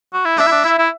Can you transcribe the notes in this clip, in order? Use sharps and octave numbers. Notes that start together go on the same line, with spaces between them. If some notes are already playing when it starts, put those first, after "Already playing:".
F#4
E4
D4 E5
E4
D4
E4
E4